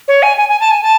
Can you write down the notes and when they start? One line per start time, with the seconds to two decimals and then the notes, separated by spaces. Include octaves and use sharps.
0.08 C#5
0.23 G#5
0.38 G#5
0.49 G#5
0.60 A5
0.71 G#5
0.83 A5